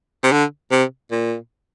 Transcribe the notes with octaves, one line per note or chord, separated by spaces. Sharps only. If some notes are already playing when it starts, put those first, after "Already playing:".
C3
D3
C3
A#2